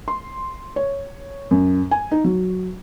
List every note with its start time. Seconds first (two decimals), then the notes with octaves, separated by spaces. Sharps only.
0.08 C6
0.76 C#5
1.51 F#2
1.91 G#5
2.11 D#4
2.24 F#3